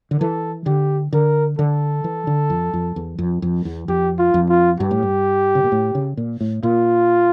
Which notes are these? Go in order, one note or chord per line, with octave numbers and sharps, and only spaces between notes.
D3
E3 A4
D3 G4
D3 A#4
D3 A4
E3
D3
F2
F2
E2
F2
F2
E2
F2 G4
F4
F2
F4
G2 G4
A2
G2
C#3
A#2
A2
C#3
A#2
A2
A#2 F4